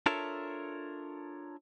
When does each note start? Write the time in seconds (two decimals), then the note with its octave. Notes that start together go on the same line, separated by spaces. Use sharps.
0.06 D4 F4 A4 A#4 C#5 E5